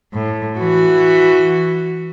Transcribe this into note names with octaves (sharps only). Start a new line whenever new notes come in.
A2
E3 F#4